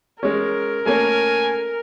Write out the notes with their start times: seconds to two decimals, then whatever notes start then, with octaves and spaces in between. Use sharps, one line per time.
0.23 G#3 C#4 A#4
0.86 A3 A#3 C#4 G#5